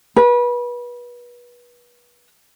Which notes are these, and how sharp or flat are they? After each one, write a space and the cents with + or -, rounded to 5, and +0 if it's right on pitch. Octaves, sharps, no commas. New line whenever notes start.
B4 -30